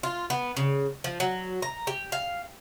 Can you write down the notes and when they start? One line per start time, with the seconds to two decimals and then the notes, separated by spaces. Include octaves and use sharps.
0.03 F4
0.30 B3
0.57 C#3
1.04 F3
1.20 F#3
1.62 A#5
1.87 G4
2.12 F5